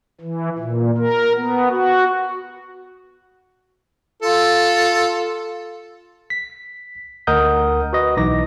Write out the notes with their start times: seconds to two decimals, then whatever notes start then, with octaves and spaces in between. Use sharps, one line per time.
0.20 E3
0.59 A#2
0.98 A#4
1.35 B3
1.69 F#4
4.22 F4 A4
6.30 B6
7.27 D2 A#4 D#5 F#5 D#6 G6
7.93 F#4 B4 D#5
8.17 B1 E3 D#4 D6 A#6